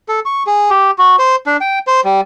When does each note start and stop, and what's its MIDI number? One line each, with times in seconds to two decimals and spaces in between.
0.09 0.20 69
0.25 0.43 85
0.47 0.70 68
0.70 0.91 67
0.98 1.16 66
1.19 1.36 72
1.46 1.57 62
1.61 1.79 79
1.87 2.01 72
2.04 2.21 55